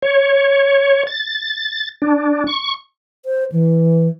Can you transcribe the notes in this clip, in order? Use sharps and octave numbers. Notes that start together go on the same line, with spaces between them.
C#5
A6
D4
C#6
C5
E3